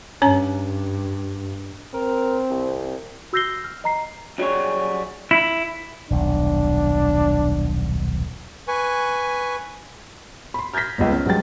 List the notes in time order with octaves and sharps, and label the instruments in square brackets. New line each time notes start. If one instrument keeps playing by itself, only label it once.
[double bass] G2 [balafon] C#4 C#5 A#5
[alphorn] C4 [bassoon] A#4
[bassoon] C2
[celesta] F#4 E6 G6 A#6 C7 G7
F6
D#5 A#5 C7
[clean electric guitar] F#2 F#3 G3 C4 G#4 C#5
[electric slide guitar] E4
[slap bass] D#1 B1 [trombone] D4
[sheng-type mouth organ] B4 G#5 C#6
[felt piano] B5 C6
F6 G6 G#6 A#6 B6
G1 C#2
C#4
G2 F#3 G#3 G5 A6